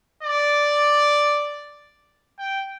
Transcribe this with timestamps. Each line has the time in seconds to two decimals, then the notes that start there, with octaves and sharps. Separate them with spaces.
0.23 D5
2.39 G5